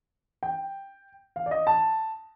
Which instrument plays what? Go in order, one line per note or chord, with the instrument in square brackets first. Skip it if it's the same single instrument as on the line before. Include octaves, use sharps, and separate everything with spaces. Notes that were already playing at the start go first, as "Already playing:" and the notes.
[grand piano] G5
F5
D5
D#5
A5